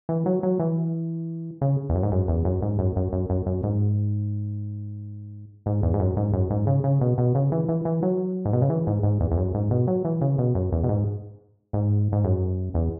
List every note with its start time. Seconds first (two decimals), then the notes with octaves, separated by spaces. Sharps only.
0.09 E3
0.26 F#3
0.43 F#3
0.60 E3
1.61 C#3
1.89 E2
1.95 F#2
2.03 G#2
2.12 F#2
2.28 E2
2.45 F#2
2.62 G#2
2.79 F#2
2.96 F#2
3.13 F#2
3.30 F#2
3.46 F#2
3.63 G#2
5.66 G#2
5.83 E2
5.94 G#2
6.00 F#2
6.17 G#2
6.33 F#2
6.50 G#2
6.67 C#3
6.84 C#3
7.01 B2
7.18 B2
7.35 C#3
7.52 E3
7.68 E3
7.85 E3
8.03 F#3
8.45 G#2
8.53 B2
8.62 C#3
8.70 E3
8.87 G#2
9.03 G#2
9.20 E2
9.31 E2
9.37 F#2
9.55 G#2
9.71 B2
9.87 F#3
10.05 E3
10.21 C#3
10.38 B2
10.55 F#2
10.72 E2
10.84 B2
10.89 G#2
11.73 G#2
12.12 G#2
12.24 F#2
12.74 E2